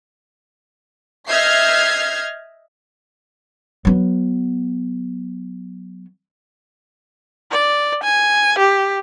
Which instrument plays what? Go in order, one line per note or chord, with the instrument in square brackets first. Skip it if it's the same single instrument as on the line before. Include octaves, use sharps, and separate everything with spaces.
[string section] D#5 E5 F6 G6 G#6 C7
[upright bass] F#3 B3
[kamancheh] D5
G#5
G4